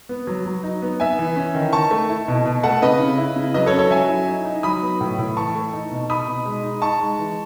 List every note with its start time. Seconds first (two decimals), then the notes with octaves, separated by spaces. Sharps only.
0.09 B3
0.27 F#3
0.46 F#3
0.63 D#4
0.82 B3
1.00 B3 E5 G#5
1.19 E3
1.36 C#4
1.55 D#3
1.73 D#3 A5 C#6
1.91 A3
2.09 E4
2.28 B2
2.46 B2
2.63 A3 F#5 A5
2.82 C#3 B4 D#5
3.00 C#3
3.18 E4
3.36 C#3
3.54 F#3 B4 D#5
3.66 A4 C#5
3.74 C#4
3.79 A4 C#5
3.91 F#3 E5 G#5
4.09 E4
4.28 D#4
4.45 D#4
4.63 F#3 B5 D#6
4.82 B3
5.01 A2
5.18 A2
5.37 E3 A5 C#6
5.55 A3
5.73 D#4
5.91 B2
6.09 D#4 B5 D#6
6.27 B2
6.45 G#3
6.64 D#4
6.81 D#4 A5 C#6
7.01 G#3
7.19 E3